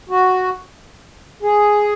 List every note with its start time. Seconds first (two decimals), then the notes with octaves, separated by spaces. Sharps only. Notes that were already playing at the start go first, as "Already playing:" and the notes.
0.09 F#4
1.42 G#4